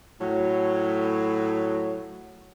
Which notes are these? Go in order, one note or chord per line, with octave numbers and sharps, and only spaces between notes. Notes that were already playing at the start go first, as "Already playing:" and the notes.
A2 F#3